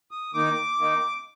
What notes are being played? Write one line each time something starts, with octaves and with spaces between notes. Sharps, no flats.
D#6
D#3 A#3 D#4 D6
D#3 A#3 D#4